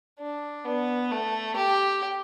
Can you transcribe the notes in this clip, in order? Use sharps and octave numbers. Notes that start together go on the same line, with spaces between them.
D4
B3
A3
G4